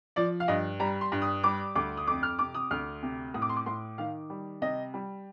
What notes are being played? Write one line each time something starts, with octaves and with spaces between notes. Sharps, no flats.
F3 D5
F5
G2 D#5
G3 A#5
C6
G2
D#6
G3 D6
D2 D6
D#6
F2 D6
F6
C3 D6
D#6
D2 F6
C3
A2 D#6
D6
C6
D6
A2 C6
D#3 F5
G3
C3 D#5
G3